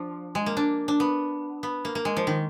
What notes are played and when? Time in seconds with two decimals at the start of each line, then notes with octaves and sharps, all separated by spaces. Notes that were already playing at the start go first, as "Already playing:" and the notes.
Already playing: F3 D4
0.35 G#3
0.46 A#3
0.57 D4
0.88 D4
1.00 B3
1.63 B3
1.85 A#3
1.95 A#3
2.05 G#3
2.17 F3
2.27 D#3